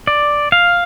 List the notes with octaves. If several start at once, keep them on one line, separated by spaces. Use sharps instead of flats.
D5
F5